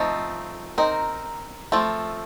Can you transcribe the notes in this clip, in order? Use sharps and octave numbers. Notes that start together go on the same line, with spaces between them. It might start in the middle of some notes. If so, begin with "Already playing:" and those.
Already playing: F3 A3 C4 D#4
C4 D#4 A#4
F3 A3 C4